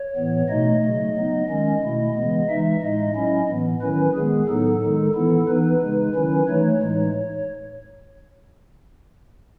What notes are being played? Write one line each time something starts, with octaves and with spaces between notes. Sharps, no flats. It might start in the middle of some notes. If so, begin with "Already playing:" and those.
Already playing: C#5
A2 E3 B3
B2 A3 D#4 D#5
C#3 F#3 A3
F#3 B3 D#4
D#3 G#3 C#4 D#5
B2 A3 E4
C#3 E3 G#3 B3
E3 G#3 D#4 E5
A2 G#3 D#4 D#5
F#3 C#4 E4 D#5
A2 E3 B3
D#3 F#3 C#4 E4 B4
D#3 G#3 B3 G#4
A2 F#3 B3 D#4 A4
D#3 G#3 D#4
E3 B3 E4 A4
E3 B3 D#4 B4
C#3 G#3 D#4
D#3 F#3 C#4 E4
E3 A3 D#4 C#5
A2 E3 G#3 D#4